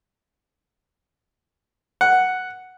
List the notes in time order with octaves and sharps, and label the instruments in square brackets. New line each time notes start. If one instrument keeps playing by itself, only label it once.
[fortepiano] F#5